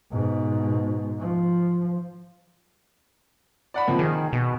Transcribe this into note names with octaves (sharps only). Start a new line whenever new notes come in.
G#2 B2
F3
D5 F#5 B5
C3 F3 A#3
D#3 G#4
B2